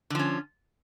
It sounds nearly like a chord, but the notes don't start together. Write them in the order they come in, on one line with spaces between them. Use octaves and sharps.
D3 F3 C#4